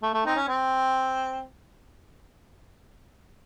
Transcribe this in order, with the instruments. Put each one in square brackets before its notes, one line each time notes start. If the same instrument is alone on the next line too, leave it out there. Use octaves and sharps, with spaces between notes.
[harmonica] A3
A3
C4 D#4
C#4
C4